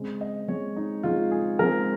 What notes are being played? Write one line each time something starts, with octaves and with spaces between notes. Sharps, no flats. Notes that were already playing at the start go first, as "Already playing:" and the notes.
Already playing: C#3 G#3 C4
D#5
C#3 G#3 C4 C#5
D#4
C#3 G#3 C4 F4
G#4
C#3 G#3 C4 A#4